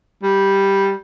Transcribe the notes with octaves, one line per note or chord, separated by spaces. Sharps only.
G3